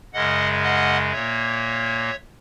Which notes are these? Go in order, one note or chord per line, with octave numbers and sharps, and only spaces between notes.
F#2 C#3 G#3 D#5 F#5
D#5 F#5
A#2 A#3 C#5 E5